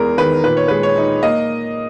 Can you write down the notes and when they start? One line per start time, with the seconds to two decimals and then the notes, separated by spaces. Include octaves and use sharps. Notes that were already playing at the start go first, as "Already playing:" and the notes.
Already playing: E2 G#3 A#4
0.18 D#3 B4
0.44 A#2 B4
0.57 C#5
0.68 G#3 B4
0.83 C#5
0.97 D#4
1.23 A#3 D#5